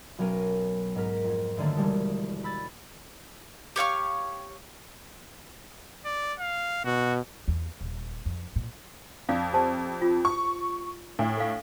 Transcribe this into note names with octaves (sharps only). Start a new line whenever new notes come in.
B1 F#3 C#4 A#4 D7 D#7
G#2 A#4 B6
F2
F#2 D3 D#3 A3 A#3
E1 G3 G#3
B5 E6 G#6 A6
G4 C#5 F5 C#6
D5
F5
B2 F#4
E2
D#1
F2
A#2
F2 D5 F5
G4 C5 A5
F4
C#6
A2 D4
A4 F5